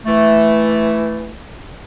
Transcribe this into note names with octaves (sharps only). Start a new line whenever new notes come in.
E3 A3